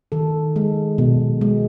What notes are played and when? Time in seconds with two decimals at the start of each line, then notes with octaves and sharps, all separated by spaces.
0.12 D#3 A4
0.56 G#3
0.98 B2
1.41 G#3